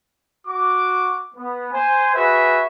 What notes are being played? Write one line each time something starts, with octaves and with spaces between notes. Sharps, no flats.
F#4 D6
B3
C5 G#5
F#4 G#4 B4 E5